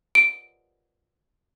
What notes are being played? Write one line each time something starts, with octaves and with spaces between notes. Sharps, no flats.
D7